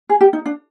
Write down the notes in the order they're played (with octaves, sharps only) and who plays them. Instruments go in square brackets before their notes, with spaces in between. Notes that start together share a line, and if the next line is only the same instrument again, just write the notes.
[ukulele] G#4
G4
D#4
D4